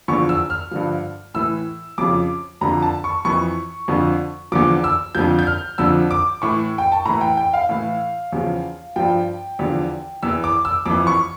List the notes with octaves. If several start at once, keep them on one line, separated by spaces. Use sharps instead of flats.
E2 D3 F3 C#6
E6
F6
G2 D3 F3
A2 E3 E6
F2 C#3 F3 D6
F2 D3 F3 A#5
A5
C#6
F2 E3 C#6
F2 D3 F3
E2 D3 F3 D6
E6
F2 D3 F3 G6
G6
F6
F2 D3 F3 E6
D6
A2 E3 C#6
G5
A5
A2 E3 A#5
G5
G5
F5
A2 E3
E2 C#3 F3
G2 F3 G5
E2 D3 F3
E2 E3 E6
D6
E6
F2 E3 D6
C#6